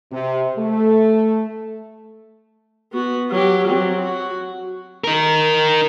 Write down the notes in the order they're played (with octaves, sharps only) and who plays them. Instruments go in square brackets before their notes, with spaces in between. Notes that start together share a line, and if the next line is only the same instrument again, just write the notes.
[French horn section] C3
A3
[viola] B3 F#4
F#3 G4
F#3 C4
F#4
[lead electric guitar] D#4 A#4